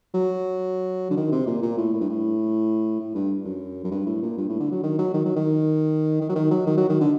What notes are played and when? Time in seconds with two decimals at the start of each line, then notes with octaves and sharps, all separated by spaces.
0.14 F#3
1.11 D3
1.17 D#3
1.32 C3
1.47 A#2
1.62 A#2
1.77 A2
1.93 A2
2.01 G2
2.09 A2
3.00 A2
3.15 G2
3.45 F#2
3.84 F#2
3.91 G2
4.06 A2
4.22 A#2
4.38 G2
4.49 A2
4.60 D3
4.72 F#3
4.83 D#3
4.99 F#3
5.14 D#3
5.25 F#3
5.36 D#3
6.21 D#3
6.29 F#3
6.35 D#3
6.51 F#3
6.67 D#3
6.77 F#3
6.89 D#3
7.01 D3